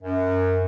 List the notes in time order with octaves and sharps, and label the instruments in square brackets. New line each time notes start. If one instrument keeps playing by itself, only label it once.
[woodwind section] F#2